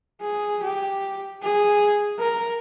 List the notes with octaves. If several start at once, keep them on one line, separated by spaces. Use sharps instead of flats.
G#4
G4
G#4
A#4